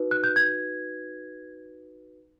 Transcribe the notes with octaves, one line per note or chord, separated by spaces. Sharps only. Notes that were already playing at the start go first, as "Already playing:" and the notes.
Already playing: D#4 F#4 B4
F#6
G6
G#6